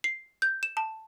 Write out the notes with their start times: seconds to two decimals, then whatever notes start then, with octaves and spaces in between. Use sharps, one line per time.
0.04 C7
0.42 G6
0.63 E7
0.77 A5